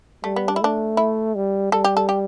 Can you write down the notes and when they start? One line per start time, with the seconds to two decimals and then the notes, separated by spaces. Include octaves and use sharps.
0.24 G3 A3
0.36 B3
0.48 D4
0.56 E4
0.61 A3 D4
0.97 E4
1.35 G3
1.72 G3 A4
1.84 G4
1.97 A4
2.09 G4